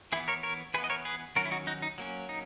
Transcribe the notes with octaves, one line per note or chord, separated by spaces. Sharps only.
E3 B3 E4 G#4
A#4 C#5
A#4 C#5
E3 B3 G#4 B4
D#5
A#4 C#5
G#4 B4
D#3 F#3 C#4 F#4 A#4
E4
D#4 F#4
D#4 F#4
D#4
F#3 A#3 C#4
D#4